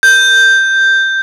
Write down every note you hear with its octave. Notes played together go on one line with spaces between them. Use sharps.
G6